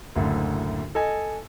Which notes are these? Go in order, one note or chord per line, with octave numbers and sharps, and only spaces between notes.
F#1 D2 A2 D3
A4 D#5 G#5